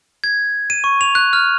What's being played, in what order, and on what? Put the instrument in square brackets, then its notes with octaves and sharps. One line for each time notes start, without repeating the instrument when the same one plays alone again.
[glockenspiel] G#6
D#7
C#6
F7
F#6
F6